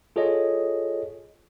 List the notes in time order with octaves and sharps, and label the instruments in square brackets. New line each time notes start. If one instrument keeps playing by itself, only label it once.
[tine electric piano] F4 G#4 A4 C#5 D#5